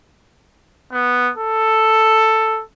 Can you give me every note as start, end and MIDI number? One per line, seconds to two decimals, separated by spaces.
0.92 1.31 59
1.37 2.62 69